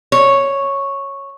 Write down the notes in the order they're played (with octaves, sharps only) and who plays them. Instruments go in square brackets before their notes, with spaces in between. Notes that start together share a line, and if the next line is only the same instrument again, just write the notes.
[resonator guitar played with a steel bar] C#5